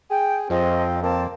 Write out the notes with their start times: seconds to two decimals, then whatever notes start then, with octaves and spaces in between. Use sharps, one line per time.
0.10 G#4 G5
0.50 F2 F3 C4 D#5
1.03 A#3 C4 A5